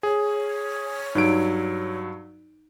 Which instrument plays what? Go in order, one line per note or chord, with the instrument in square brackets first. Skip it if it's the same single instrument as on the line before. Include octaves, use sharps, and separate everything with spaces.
[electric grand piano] G#4 [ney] C#5
[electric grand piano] G2 F#3 D7 [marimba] D#4